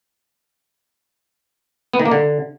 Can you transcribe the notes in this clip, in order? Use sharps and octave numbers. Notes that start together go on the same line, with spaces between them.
B3
D#3
A#3
D3